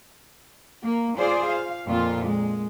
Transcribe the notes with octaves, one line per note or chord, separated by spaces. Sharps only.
A#3
F4 G#4 C5 D5
F5
F2 A#2 F4
G#3